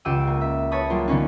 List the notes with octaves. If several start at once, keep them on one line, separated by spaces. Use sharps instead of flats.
C#2 F4 G4 F#5 E6 D#7
G#3 A#3
E5
B4 C#5 A5 B5 D#6
F#3 G3 A#3 F4
D3 B3 C#4 D#4